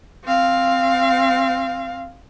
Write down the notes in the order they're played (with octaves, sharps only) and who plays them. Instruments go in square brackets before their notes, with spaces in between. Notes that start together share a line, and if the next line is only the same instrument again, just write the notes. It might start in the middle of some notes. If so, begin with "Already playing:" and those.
[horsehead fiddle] C4 F5